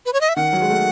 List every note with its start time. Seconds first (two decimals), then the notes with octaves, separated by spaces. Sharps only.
0.06 B4
0.13 C#5
0.21 D#5
0.29 E5
0.36 D#3 F#5
0.53 F#3
0.62 G#3
0.70 A3